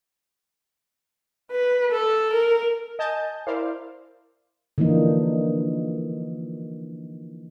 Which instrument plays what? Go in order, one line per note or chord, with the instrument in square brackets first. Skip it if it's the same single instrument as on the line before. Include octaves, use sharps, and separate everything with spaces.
[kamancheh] B4
A4
A#4
[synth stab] D#5 G#5 A5 G6
E4 A#4 C5 D5 F5
[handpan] D3 E3 F3 A#3 D#4